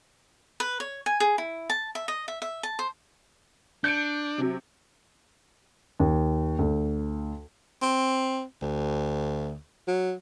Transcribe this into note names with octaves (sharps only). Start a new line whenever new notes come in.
B4
C#5
G#5
G#4
E4
A5
E5
D#5
E5
E5
A5
C5
D4 G6 C#7 D7
C3 F#3
D#2
D2
C4
D2
F#3